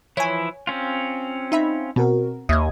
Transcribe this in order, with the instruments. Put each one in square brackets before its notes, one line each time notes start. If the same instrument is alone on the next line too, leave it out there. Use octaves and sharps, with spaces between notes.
[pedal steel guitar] E3 F3 E4 [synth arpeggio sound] C#5 G#5
[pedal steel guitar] C4 C#4 F4
[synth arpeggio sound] D#4 E5 B5
[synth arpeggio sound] B2 [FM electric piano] C4 F#4 A#4
[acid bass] D#2 [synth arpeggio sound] D#5 E5 [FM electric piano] D#6 G#6